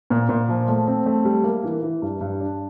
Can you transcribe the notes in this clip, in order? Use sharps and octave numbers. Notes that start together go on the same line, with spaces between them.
A#2
A#2
F3
A3
C4
A3
G3
A#3
E3
E3
G2
G2
D4